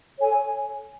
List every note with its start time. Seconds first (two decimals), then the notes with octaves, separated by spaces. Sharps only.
0.18 A4 C#5 G#5